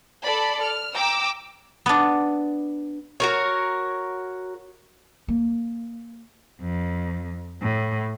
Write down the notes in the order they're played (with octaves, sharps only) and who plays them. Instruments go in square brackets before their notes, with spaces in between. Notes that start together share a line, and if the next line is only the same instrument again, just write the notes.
[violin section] A4 D5 B5
F6
G5 A#5 D6 E6
[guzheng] B3 D4
[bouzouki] F#4 A#4 C#5
[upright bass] A#3
[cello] F2
A2